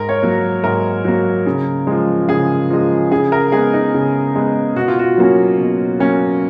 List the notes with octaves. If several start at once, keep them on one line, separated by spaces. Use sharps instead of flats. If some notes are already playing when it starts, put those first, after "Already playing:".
Already playing: G#2 A#4
C#5
F#3 A#3
G#2 A#4
F#3 A#3
C#3
F3 G#3
C#3 G#4
F3 G#3
C#3 G#4
A#4
G#3 B3 G#4
D#4
C#3
G#3 B3
B2 F#4
F4
F#4
F#3 A#3 C#4
B2
F#3 A#3 C#4